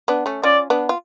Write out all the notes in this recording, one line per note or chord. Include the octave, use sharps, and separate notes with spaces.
B3 D4
A3 C#4
C#4 F4 D5
B3 D4
F4